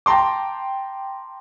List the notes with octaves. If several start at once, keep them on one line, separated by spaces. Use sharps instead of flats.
G5 A5 A#5 C6 D6